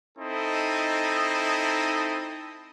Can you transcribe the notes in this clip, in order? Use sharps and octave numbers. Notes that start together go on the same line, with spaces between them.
C4 D#4 E4 A4 D#5